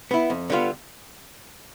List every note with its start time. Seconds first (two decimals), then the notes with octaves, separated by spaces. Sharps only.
0.11 B3 E4
0.30 F2
0.50 D3 G3 B3 F4